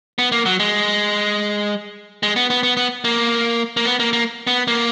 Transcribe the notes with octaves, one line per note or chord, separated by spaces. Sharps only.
B3
A#3
F#3
G#3
G#3
B3
B3
B3
B3
A#3
A#3
B3
A#3
A#3
B3
A#3